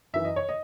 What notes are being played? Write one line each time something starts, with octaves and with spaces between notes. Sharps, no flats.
F#2 E3 E5
D#5
C#5
D#5